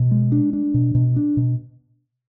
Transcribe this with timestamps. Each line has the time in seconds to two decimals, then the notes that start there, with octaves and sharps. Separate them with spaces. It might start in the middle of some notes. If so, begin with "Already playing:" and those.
Already playing: B2
0.11 G#3
0.32 D4
0.53 D4
0.74 B2
0.95 B2
1.16 D4
1.37 B2